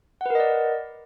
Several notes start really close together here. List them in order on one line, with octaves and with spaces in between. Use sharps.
F#5 B4 A#4 D#5 D5